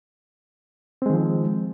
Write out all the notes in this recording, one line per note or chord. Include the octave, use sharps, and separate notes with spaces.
D#3 F3 G#3 C4